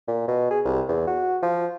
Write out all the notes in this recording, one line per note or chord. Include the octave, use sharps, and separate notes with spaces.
A#2
B2
G#4
C2
E2
F#4
F3